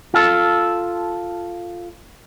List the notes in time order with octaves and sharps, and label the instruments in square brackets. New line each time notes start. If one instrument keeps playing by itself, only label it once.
[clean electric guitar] F4 A4